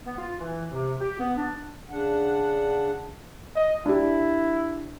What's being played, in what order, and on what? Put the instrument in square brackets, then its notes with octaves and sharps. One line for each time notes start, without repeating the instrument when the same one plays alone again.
[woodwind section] B3
F4
E3
C3
G4
B3
D4
[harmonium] C#3 D4 F#5
[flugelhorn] D#5
[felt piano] D4 G4 [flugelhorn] E4